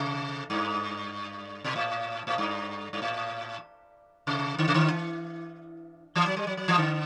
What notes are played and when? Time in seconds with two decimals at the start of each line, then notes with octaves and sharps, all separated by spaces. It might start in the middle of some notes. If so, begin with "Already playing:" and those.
Already playing: C3
0.50 G2
1.64 B2
1.76 A2
2.27 A2
2.38 G2
2.93 G2
3.02 A2
4.27 C3
4.58 D3
4.68 C3
4.74 D3
4.90 E3
6.15 E3
6.26 F#3
6.37 G3
6.47 F#3
6.57 F#3
6.68 E3
6.78 D3